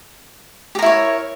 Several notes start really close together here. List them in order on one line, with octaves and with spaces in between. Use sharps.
G4 A#4 E4 C#5